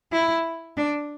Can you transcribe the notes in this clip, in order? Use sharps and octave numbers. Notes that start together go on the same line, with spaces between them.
E4
D4